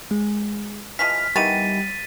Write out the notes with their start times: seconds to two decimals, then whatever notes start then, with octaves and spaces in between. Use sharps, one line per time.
0.11 G#3
0.99 E3 F3 G#3 F6 B6
1.36 D#3 E3 G3 B3 A6 D#7